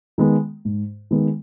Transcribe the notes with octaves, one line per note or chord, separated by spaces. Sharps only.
D#3 G#3 B3
G#2
D#3 G#3 B3